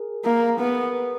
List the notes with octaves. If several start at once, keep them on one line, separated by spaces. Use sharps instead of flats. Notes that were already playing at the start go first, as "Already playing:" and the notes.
Already playing: G#4 A#4
A#3
B3